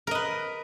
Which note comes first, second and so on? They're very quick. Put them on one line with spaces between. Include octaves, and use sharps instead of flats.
A#4 D#5 B4